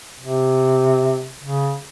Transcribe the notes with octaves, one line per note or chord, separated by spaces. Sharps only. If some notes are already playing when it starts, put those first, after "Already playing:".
C3
C#3